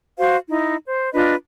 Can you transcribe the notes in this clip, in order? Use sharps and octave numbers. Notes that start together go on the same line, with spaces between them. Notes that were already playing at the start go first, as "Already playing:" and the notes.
F#4 C5 F5
D#4 E4
C5
D4 F4 B4 D#5